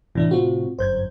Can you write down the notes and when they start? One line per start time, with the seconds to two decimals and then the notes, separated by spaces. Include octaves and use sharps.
0.15 A2 C3 E3 D4 E4
0.31 C4 F4 F#4
0.79 G1 F#2 C5 G6 G#6